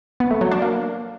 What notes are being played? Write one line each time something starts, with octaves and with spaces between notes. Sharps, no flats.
B3
A3
F#3
D4
A#3